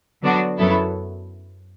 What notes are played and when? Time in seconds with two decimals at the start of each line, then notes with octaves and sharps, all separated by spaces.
0.22 D3 F#3 B3 D4 F#4
0.58 F#2 F#3 B3 E4 A4